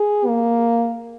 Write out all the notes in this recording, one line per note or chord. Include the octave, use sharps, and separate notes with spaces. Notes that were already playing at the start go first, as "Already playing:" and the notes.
Already playing: G#4
A#3